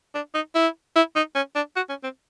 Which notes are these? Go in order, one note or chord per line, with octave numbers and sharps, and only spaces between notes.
D4
D#4
E4
E4
D#4
C#4
D4
F#4
C#4
C4